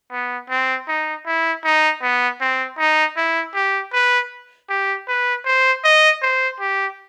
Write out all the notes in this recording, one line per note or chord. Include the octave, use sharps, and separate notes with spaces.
B3
C4
D#4
E4
D#4
B3
C4
D#4
E4
G4
B4
G4
B4
C5
D#5
C5
G4